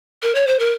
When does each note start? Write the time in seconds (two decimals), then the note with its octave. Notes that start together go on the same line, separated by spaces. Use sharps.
0.22 A#4
0.35 C#5
0.47 C5
0.59 A#4